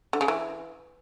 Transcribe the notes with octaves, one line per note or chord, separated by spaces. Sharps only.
D3
C#3
E3